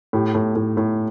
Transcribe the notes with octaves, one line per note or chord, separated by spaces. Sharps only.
A2 G4
A2
A2
A2